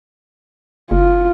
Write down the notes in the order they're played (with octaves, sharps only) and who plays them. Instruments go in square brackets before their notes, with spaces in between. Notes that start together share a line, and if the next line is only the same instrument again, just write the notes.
[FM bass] F#1 [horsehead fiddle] F4